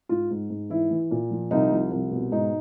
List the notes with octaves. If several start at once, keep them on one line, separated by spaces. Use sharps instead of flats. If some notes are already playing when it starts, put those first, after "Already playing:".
G#2 F4
G#2
G#2
E3 E4
E3
A#2
F3
C2 D#4
F3
C2
B2
G#2 D#4